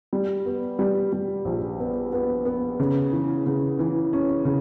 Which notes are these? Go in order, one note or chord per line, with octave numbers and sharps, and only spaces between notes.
G3
B3
G3
G3
A#1
B3
B3
B3
C#3
E3
C#3
E3
C#4
C#3